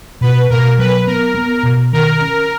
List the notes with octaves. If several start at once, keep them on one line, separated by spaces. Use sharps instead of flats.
B2 B4
B2 A#4
F#3 B4
B3 A#4
B3
B2
D#3 A#4
C#4